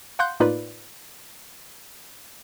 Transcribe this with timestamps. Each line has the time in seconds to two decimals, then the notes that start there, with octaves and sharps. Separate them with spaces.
0.19 F5 F#5 C6 F#6 G6
0.40 A2 A#3 D#4 F4 B4 D5